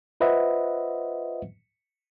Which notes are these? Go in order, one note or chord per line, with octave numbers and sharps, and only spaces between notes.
F4 B4 C5 D#5 E5 F#5